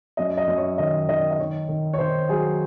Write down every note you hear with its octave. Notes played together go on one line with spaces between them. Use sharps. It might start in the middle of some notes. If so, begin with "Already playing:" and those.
F#2 D#5
D#5
F#2
C#5
D#3 D#5
D#3 D#5
D#5
D#3 C#5
D#3
C#5
D#3 C5
F#3 G#4